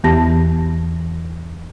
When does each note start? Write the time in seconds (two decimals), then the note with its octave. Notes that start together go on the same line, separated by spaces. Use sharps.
0.04 E2 E3 B3 G4 A5 A#6